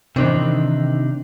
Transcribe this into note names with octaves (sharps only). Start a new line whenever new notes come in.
C3 D#3 E3 D4 D#4 C5